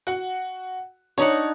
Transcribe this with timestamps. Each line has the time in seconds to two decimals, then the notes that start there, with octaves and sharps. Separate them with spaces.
0.07 F#4 F#5
1.18 D4 D#4 C#5 F#5